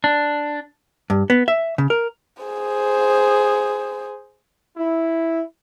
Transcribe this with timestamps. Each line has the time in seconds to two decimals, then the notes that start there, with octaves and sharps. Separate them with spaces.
0.04 D4
1.10 G2
1.30 B3
1.48 E5
1.78 C#3
1.90 A#4
2.43 G#4 C5
4.76 E4